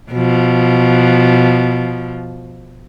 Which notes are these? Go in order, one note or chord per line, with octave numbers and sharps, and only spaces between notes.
B2 F3